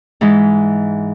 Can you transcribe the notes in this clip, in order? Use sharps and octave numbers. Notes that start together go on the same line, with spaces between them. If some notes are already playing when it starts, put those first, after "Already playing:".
G#2 E3 G#3